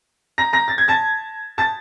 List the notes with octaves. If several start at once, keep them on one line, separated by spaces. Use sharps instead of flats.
A#5 A#6
A#5 A#6
A6
G#6
A5 A6
A5 A6